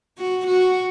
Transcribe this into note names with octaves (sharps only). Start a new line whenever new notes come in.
F#4
F#4